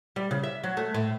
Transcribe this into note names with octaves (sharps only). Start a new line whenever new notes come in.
G3
C#3
E5
F#3
A3
A2